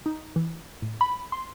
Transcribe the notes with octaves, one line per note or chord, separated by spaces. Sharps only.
D#4
E3
A2
B5
C6